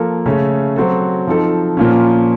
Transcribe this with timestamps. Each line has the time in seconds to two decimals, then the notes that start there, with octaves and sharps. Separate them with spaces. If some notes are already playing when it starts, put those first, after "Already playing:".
Already playing: F3 A#3 F4 A4
0.26 C#3 A3 C#4 A4
0.76 F#3 C4 F#4 A4
1.27 F3 C4 D#4 A4
1.77 A#2 F3 A#3 C#4